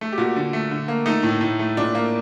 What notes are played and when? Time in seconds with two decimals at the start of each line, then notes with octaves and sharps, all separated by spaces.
0.01 A3
0.12 G4
0.18 A#2 F#4
0.36 D3
0.53 A3
0.71 D3
0.88 A#3
1.06 A3 D#4
1.23 A2
1.41 A2
1.59 A3
1.77 A#2 D4
1.95 A#3